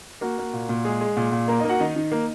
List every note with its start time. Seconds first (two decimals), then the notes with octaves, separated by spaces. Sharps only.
0.21 A#3 F#4
0.38 A#3
0.53 A#2
0.69 A#2
0.84 G#3 G#4
1.00 G#3
1.16 A#2
1.32 A#2
1.48 A#3 A#4
1.59 A#3 D#4 D#5
1.69 F#4 F#5
1.79 D#3 D#4 D#5
1.96 D#3
2.12 A#3